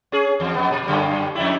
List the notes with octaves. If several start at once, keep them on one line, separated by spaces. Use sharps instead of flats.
C#4 G#4
E2
F2 B3
A#2
F#2 D3 G3
F2 G3 E4